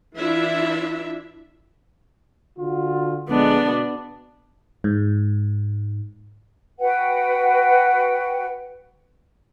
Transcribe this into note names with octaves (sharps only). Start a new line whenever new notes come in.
E3 D4 E4 F4 E5
D3 F4 F#4
A#1 D3 G#3 B3 D4
B2
G#2
F#4 B4 F#5 G5